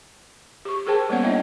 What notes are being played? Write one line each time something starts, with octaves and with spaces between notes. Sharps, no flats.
G4 C#6
G#4 A#4 C5 G5 A5
G3 A#3 B3 C#4 C#5 F#5
D4 E4 C#5 D#5 E5 G5